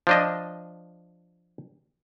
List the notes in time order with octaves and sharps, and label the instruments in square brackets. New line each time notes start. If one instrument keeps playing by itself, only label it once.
[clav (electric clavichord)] F3 D4 D#5